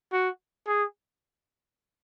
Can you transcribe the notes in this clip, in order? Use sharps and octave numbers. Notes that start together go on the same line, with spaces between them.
F#4
G#4